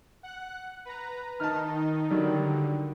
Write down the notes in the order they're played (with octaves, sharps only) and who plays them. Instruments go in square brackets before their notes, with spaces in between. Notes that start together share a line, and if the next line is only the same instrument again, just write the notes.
[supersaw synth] F#5 F#6
B4 A#5
[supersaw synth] D#3 D#4 [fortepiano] A5 F6
[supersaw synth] D3 [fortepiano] D#3 F#3 G3